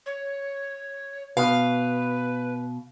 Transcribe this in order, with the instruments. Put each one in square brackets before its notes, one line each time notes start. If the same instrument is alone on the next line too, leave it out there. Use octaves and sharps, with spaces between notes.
[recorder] C#5
[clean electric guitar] B2 [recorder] B4 [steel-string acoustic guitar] F5